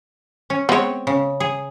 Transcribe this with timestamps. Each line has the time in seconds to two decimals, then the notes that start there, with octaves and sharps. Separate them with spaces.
0.50 C#4
0.69 G#3 B3 C4 C#5
1.07 C#3
1.40 G#4